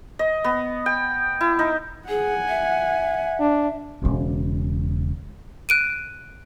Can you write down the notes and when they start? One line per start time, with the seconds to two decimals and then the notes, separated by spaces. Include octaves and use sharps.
0.19 D#5
0.44 B3
0.86 G5
1.41 E4
1.59 D#4
2.09 G#4 F#5 G#5
2.49 E5
3.40 D4
4.02 E1 C#3
5.69 F#6 D7 D#7